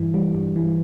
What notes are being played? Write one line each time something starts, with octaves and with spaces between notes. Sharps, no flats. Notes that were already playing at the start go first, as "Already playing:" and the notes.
Already playing: G2 E3
G3
G2
E3